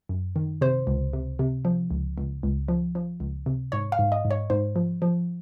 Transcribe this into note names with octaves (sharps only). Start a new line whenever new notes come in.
F#2
D#3
C3 C5
C#2
C3
C3
F3
C#2
C#2
C#2
F3
F3
C#2
C3
G#2 C#5
F5
G#2
D#5
G#2
C#5
G#2 C5
F3
F3